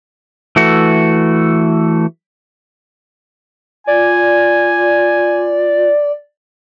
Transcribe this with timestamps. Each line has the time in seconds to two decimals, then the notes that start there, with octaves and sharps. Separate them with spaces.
0.56 E3 A3 F#4
3.87 F4 D5 G#5